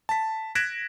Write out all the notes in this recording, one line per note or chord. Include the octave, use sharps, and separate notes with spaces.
A5 B6
F#6 G#6 A#6 B6 D7 E7